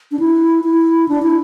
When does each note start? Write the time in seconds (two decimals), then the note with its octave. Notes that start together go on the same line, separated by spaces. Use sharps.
0.12 D4
0.19 E4
0.64 E4
1.08 D4
1.22 E4